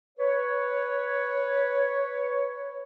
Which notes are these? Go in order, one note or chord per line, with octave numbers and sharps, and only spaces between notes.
B4 C#5